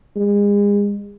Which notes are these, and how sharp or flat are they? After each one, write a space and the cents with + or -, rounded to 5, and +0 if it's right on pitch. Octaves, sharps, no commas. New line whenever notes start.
G#3 -35